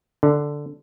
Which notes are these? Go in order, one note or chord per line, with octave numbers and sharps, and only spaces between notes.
D3